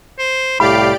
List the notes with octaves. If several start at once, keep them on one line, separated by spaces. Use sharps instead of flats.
C5
C2 A2 G4 D5 F5 B5 D7